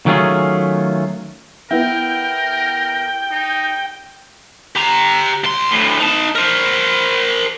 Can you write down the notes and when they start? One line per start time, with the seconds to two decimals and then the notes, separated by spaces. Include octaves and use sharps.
0.06 D#3 F#3 A3 C#4 F4 G#4
1.71 B3 E4 A#4 G5
3.32 D#4
4.75 G4 A#5
5.44 C#2 C6
5.71 D2 A2
6.00 D#4 A5
6.35 A#4 C5